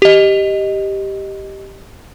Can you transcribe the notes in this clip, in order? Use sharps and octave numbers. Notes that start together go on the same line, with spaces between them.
G4 D#5